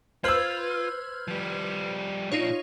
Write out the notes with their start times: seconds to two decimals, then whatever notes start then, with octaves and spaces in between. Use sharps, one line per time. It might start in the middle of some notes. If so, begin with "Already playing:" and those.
0.24 F4 B4 C5 E6 F6 G#6
1.28 F3 G3
2.32 A#2 D4 D#4 F4 C#5